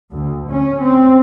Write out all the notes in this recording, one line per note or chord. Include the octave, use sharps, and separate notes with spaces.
D2
C#4
C4